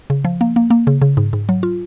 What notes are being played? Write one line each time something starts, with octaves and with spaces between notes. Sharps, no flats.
C#3
F3
A#3
A#3
A#3
C#3
C#3
G#2
G#2
F#3
F4